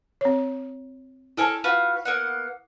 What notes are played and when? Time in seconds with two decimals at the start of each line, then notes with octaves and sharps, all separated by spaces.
0.21 C4 C#5
1.37 E4 A4 A#4 C#5 G#5 A5
1.64 F4 F#4 B4
2.05 A#3 B3 F#5